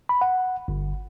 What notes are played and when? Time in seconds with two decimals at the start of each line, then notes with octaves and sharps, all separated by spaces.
0.09 B5
0.21 F#5
0.68 G1